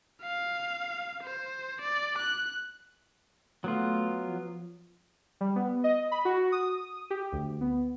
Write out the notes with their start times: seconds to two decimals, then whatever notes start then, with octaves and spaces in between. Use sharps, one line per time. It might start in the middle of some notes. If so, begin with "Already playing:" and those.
0.22 F5
1.23 C5
1.81 D5
2.18 F#6
3.64 F#3 A3 B3 F4
4.28 F3
5.41 G3
5.56 B3
5.84 D#5
6.12 B5
6.25 F#4
6.52 D#6
7.10 G4
7.32 D2
7.61 B3